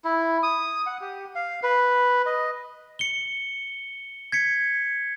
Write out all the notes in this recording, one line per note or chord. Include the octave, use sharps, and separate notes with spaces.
E4
D#6
F#5
G4
F5
B4
D#5
C#7 G7
G#6 B6 C#7